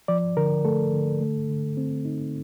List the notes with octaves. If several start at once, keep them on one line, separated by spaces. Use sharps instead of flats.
F3 D5
D3 A#4
A3 A4
D3
A3
D3
C4
D#4